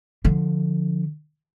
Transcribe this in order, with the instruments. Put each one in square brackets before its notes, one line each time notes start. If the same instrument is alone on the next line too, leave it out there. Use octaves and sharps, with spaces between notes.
[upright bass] D3 F3